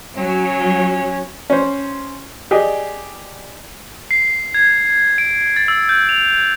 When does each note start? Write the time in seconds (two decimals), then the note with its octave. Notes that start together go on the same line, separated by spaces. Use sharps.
0.17 F#3 C#4
1.50 C#4 C5
2.51 G4 G#4 D5 D#5
4.11 C7
4.54 G#6
5.18 D7
5.56 A6
5.68 E6
5.89 G6
6.09 F7